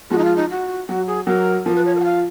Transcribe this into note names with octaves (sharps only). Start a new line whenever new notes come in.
F3 G#3 F#4
D#4
F4
D#4
F#4
F#3 F#4
G#4
F#3 A#4
F3 A#4
B4
C#5
A#4
F#5
F5